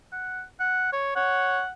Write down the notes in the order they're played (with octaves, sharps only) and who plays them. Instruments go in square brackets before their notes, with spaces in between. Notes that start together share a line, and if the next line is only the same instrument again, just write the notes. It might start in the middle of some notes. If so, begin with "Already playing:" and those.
[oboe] F#5
F#5
C#5
[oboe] C#5 [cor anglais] F#5